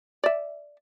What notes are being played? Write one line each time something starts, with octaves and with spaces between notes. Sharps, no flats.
D5 E5